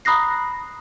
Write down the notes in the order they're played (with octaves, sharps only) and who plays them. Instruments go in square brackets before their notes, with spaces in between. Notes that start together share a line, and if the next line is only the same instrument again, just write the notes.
[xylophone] A#5 B5 D#6 F#6 A#6 C7